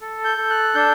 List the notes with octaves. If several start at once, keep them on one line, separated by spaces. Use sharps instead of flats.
A4
G6
A4
F#6
D4 G6